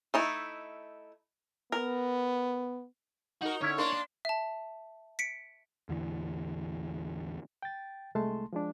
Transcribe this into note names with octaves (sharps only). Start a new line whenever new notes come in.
A3 D#4 E4
B3 A#4
D#4 F#4 A#4
D3 C#4 E4 C#5
A#3 D4 A#4 C6
E5 A5
B6 C#7 D7
A1 E2 D3 E3
G5 A6
C2 G#3 A3 A5 C6
F3 G#3 D4